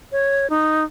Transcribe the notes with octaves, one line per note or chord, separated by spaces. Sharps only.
C#5
D#4